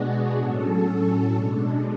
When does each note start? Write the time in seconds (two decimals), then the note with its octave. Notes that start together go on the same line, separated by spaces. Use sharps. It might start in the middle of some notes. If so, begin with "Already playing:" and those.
Already playing: B2 G#3 B3 D4 F#4 G#4
0.38 A2 F#3 C#4 A4
1.34 B2 G#3 D4